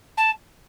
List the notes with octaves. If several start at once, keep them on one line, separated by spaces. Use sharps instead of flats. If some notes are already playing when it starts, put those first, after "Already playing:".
A5